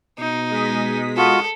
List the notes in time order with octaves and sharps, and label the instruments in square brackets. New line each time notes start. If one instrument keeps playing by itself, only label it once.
[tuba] B2 [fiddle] D#4
[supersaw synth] G#3 D#6 B6
[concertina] F4 F#4 [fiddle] A4